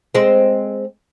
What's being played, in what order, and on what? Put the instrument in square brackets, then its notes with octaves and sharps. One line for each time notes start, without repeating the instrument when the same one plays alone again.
[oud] G#3 C4